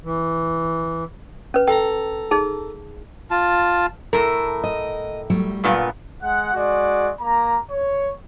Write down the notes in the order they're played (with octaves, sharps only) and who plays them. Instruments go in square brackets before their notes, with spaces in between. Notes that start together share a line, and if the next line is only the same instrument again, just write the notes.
[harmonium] E3
[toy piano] C#4 B4
[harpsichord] A4 A#5 [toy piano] G5
[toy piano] D#4 G#4 A5
[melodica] F4 A5
[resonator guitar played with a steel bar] A2 A#4 [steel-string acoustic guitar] A4
[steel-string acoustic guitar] D#5
F#3 G3 A3
[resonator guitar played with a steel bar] G2 A#2 B3
[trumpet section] G#3 F#5
G#3 F#4 D5
A#3 A#5
C#5